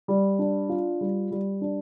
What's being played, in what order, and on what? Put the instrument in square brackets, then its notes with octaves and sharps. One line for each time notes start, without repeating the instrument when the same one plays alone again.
[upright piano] G3
D4
F4
G3
G3
D4